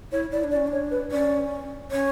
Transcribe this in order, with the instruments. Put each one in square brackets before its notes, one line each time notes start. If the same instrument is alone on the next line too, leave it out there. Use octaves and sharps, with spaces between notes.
[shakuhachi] E4 [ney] C#5
[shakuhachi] E4 [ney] D5
[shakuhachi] D4
[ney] D5
[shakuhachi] C#4
[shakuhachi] D4 [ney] C#5
[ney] B4
[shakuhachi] C#4 [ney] D5
[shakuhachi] C#4 [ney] C#5